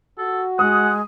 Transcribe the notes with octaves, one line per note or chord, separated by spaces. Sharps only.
F#4 A4
G#3 F#5 D#6